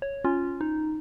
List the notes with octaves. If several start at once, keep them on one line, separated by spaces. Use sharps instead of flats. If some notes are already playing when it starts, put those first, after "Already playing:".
C#5
C#4 F4
D#4